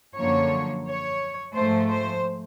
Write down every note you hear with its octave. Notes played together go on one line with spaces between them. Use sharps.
F#2 D3 F3 A#3 C#5
C#5
G#2 F3 A3 C5
C5